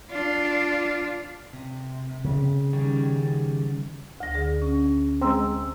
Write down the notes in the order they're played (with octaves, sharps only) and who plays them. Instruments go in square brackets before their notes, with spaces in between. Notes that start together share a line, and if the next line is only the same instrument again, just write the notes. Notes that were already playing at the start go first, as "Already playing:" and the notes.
[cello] D4 F4
[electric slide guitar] C3
[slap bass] C#3
[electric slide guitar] D#3 G3 C#4
[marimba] D2 A#6
D3 G#4
C#4
[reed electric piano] G#3 C4 [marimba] A#5 C6 E6